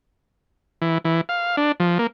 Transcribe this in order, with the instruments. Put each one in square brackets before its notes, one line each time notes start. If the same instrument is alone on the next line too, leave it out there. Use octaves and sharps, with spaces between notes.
[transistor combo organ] E3
E3
F5
D4
F3
A#3